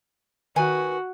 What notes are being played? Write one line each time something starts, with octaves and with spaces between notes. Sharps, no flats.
D#3 F#4 B4 G#5